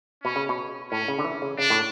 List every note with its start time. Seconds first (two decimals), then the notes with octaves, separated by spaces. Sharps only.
0.24 B2 C#4
0.36 C#3
0.49 B2
0.91 A2 C#4
1.08 C#3
1.19 D3
1.24 E3
1.42 C#3
1.59 C#3 D4
1.70 A2